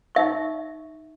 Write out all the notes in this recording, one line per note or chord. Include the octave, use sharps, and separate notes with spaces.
D#4 E5 C#6